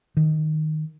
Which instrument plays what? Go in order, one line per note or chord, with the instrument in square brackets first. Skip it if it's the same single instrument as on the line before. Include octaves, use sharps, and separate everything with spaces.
[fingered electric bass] D#3